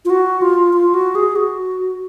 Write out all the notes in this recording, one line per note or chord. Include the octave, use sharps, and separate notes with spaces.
F4
F#4
F4
F4
F#4
G#4
F#4